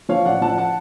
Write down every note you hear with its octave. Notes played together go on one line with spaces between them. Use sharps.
F3 C#5 F5
A1 D5 F#5
F3 F#5 A5
F#5 A5